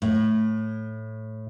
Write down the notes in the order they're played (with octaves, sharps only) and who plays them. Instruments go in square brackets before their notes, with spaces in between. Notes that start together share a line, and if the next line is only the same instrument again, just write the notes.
[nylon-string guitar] A2